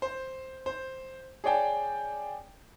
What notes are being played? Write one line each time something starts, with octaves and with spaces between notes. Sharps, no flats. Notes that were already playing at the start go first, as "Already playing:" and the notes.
C5
C5
G#4 C#5 D5 G5 A5